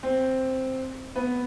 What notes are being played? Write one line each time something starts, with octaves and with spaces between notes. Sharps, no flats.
C4
B3